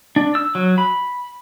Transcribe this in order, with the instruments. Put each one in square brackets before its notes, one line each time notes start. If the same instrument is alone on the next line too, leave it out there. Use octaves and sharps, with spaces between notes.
[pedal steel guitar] D4
E6
F#3
B5